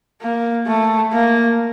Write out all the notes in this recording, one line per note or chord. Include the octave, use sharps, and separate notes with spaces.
A#3
A3
A#3